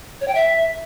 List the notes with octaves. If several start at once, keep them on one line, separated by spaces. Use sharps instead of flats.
C#5
G5
E5